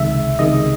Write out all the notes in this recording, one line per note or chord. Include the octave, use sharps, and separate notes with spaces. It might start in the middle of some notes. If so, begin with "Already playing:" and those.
Already playing: C#2 C3 D#3 G#3 E5
C#2 C3 D#3 G#3 D#5